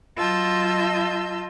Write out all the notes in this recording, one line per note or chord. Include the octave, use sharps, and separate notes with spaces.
F#3 F4 D#5 A5 E6 G6